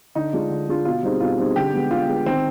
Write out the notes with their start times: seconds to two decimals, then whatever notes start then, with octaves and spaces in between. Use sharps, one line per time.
0.15 D3 D#4
0.33 G#3 D4 F4
0.50 D3
0.69 G#3 D4 F4
0.85 B2 F4
1.03 G3 C4 D#4 G#4
1.20 B2 F4
1.38 G3 C4 D#4 G#4
1.56 D3 G4
1.73 G#3 B3
1.91 D3 F4
2.08 G#3 B3
2.26 D#3 C4